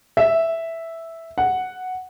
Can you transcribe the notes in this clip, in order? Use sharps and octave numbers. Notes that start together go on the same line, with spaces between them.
E5
F#5